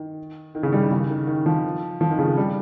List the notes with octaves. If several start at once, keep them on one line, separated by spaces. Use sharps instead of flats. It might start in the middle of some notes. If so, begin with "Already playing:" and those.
Already playing: D#3
D#3
C#3
G3
D#3
C#3
D#3
D#3
F3
F3
D#3
C#3
D#3
G3